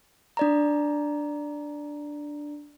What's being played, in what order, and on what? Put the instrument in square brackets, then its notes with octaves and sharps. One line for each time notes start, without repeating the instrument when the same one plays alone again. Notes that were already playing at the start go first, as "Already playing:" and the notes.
[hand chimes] D4 D5 A#5